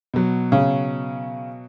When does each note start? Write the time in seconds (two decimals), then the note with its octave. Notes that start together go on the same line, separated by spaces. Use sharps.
0.14 B2 F#3
0.52 C#3